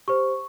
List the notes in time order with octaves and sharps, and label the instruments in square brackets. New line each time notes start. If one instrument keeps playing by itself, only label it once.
[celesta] G4 C5 C#6